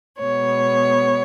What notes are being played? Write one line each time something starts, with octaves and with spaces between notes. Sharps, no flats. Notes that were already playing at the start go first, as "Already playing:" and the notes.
B2 G#3 B3 C#5